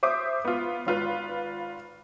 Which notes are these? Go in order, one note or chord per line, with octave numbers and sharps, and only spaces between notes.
C5 E5 D6 D#6
B3 F4
G#1 F4 B4